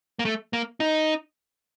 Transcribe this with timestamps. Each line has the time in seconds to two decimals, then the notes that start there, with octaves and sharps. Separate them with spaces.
0.19 A#3
0.25 A3
0.53 A#3
0.80 D#4